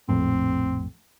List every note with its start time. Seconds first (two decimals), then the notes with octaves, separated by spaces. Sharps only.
0.09 A#1 F2 A2 C4